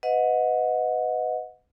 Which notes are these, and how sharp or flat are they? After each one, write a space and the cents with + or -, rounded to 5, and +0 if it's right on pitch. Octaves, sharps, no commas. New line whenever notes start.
B4 +20 D#5 +20 F#5 -25